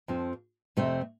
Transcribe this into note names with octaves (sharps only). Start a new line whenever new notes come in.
F2 F3 C4
F2 C3 A3 C4